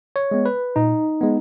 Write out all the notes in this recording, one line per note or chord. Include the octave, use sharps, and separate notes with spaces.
C#5
G#3 B3
B4
A#2 D#4
G#3 B3